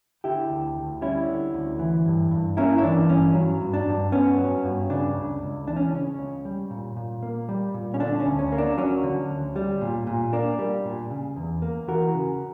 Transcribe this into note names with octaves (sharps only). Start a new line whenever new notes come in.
D3 E4 G4
D2
D2
G3 C#4 E4
D3
D2
E3
G2
G2
A#3 C#4 E4
E4
E3 D4
G2 C#4
F#3
G2
D4
G2
B3 C#4
F#3
G2
C#3 D4
C#2
C#2
E3 D4
C#4
C#3 C#4
C#2
G3
A#2
A#2
A#3
G3
A#2
C#4
D3 D4
C#4
D2
C#4
A#3
D4
F#3 C#4
D3
D2
G3
A#2
A#2
A#3 D4
G3
A#2
C#3
E2
A#3
E3 F#4 A#4
C#3